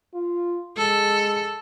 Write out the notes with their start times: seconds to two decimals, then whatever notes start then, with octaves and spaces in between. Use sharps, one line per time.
0.14 F4
0.77 G#3 A4